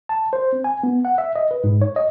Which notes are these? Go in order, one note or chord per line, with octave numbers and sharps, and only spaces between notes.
A5
C5
C4
G#5
B3
F#5
E5
D#5
B4
G#2
C#5
D#5